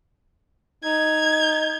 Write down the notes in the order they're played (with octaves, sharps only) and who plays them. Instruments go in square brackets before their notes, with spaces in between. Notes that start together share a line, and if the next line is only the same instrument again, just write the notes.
[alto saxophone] D#4 [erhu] G#6